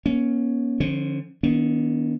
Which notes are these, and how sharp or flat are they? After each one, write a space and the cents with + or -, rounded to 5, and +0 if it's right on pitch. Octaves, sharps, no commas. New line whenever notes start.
A#3 +45 C#4 +0
D3 +25 F3 +0 C#4 -25
D#3 +15 B3 -25 D4 -45